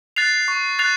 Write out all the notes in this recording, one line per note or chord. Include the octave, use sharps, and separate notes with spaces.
F#6 A6 C7 F7
C#6
F#6 A6 C7 F7